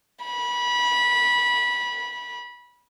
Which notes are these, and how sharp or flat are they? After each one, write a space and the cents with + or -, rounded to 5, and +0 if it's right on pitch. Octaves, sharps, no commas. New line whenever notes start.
B5 -20